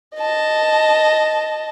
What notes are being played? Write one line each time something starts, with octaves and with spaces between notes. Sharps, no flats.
D#5 A5